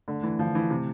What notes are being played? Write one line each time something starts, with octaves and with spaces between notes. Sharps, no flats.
D3 A3
E3 A3
D3 F3
E3 E4
C3